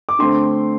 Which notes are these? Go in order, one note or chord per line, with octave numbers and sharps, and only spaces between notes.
D6
D3 A3 C4 C6